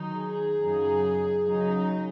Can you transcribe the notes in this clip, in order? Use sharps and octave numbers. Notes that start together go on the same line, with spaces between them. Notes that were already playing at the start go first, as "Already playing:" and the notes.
Already playing: D#3 F#3 D#4
G#4
F#2 C#3 F#3 D#4
C#3 F#3 D#4